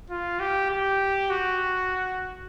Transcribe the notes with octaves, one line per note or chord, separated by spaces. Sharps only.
F4
G4
G4
F#4